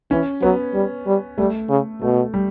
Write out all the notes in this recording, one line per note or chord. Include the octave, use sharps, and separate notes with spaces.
E3 C#4
F#3 B3
G3
G3
G3 A3
C#3
B2 A3
G3